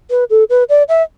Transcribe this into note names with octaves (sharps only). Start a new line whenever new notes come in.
B4
A4
B4
D5
E5